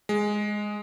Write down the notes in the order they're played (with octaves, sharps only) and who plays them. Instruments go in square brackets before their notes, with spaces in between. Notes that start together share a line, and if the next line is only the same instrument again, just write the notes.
[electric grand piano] G#3